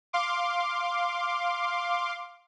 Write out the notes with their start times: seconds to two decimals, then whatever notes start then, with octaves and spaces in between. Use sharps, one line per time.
0.13 F5 C6 D6